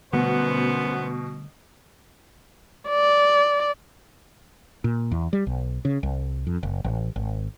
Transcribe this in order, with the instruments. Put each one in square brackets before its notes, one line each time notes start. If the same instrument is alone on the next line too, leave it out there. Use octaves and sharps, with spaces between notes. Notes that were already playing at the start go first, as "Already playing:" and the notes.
[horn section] F#2 B3 C5 [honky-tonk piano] B2 [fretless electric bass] D3 G3 A3
[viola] D5
[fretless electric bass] A#2
E2
G3
B1
C#3
C2
F2
F#1
A1
G#1